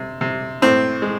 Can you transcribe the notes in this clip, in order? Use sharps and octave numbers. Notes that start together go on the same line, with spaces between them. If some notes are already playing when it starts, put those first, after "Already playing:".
Already playing: C3
C3
A2 C4
G#3